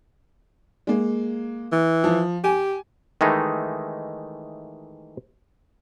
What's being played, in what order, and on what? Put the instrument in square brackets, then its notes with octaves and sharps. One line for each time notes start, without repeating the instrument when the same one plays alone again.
[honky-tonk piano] G#3 A#3
[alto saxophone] E3
[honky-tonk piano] F3
[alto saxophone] G4 [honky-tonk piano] G#5
[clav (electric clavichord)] D#3 E3 G#3 A3 D#4